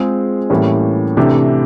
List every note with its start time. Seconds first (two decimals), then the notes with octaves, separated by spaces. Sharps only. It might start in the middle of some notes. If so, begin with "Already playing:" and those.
Already playing: G#3 C4 F4 G#4
0.50 A2 E3 G3 A#3 C#4
1.17 C3 E3 A3 D4 G4